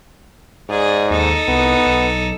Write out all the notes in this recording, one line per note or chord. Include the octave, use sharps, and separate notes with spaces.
G#2 G#4 D5
D#2 D#4 A4
C2 B3
B1